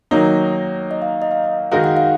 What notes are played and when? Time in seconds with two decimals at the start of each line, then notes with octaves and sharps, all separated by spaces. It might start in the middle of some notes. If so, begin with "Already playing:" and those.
0.11 D#3 F#3 A#3 D#4 C#5
0.91 D#5
1.02 F5
1.22 D#5
1.31 F5
1.71 D#3 G#3 D#4 F#4 A#4 F5
1.84 F#5
1.97 F5